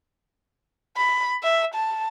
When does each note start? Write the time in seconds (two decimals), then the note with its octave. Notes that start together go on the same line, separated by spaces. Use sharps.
0.97 B5
1.43 E5
1.74 A5